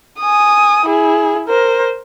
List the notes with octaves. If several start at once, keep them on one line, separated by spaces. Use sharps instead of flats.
G#5 D#6
E4 G#4
A#4 C5